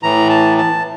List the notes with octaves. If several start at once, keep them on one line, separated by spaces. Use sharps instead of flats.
A2 E3 A#5
A5
A5